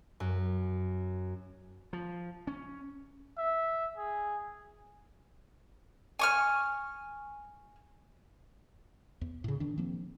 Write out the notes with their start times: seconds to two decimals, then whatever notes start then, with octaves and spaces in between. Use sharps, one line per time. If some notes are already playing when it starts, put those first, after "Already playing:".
0.20 F#2
1.93 F3
2.47 C#4
3.37 E5
3.97 G#4
6.19 G#5 C#6 F6
9.21 E2
9.44 A2 C#3
9.60 D#3 D4
9.78 F3 A#3 C4